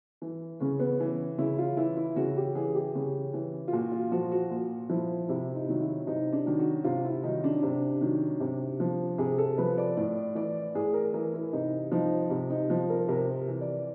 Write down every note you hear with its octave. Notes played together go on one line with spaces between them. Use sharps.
E3
C#3 C#4
B3
E3
C#3 E4
F4
E3 E4
E4
C#3 F#4
G4
E3 G#4
G4
C#3
E3
F4
A#2 F#4
F4
F3 F#4
F#4
A#2
F3 E4
C3 E4
D#4
D#3 F#3
E4
C3 D#4
D4
D#3 F#3
F#4
C3 F4
E4
D#3 F#3 D#4
D4
C3
D#3 F#3
C3
F3
C3 G#4
A4
F3 B4
D5
A2 D5
E3 D5
A2 G#4
A#4
E3 A#4
E4
C3 D#4
F3 D#4
C3
D#4
F3
A#4
C3 A#4
E3
D5